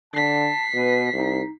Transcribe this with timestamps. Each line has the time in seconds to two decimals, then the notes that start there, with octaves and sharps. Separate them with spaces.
0.14 D3 A5 B6 C7
0.74 B2 B4
1.13 C2 D#4